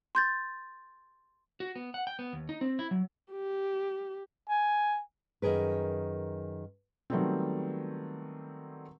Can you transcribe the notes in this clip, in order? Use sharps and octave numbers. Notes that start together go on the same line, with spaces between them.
C6 G6 A6
F#4
B3
F#5
G5
B3
D#2
D#4
C4
E4
F#3
G4
G#5
F#2 D#3 G#4 A#4 B4
D#3 F#3 G3 A3 B3 C4